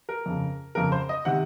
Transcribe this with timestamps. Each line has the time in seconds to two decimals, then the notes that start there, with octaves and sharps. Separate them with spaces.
0.09 A#4
0.26 F2 C#3
0.75 F2 C#3 A#4
0.92 C5
1.09 D#5
1.25 C3 D#3 F#5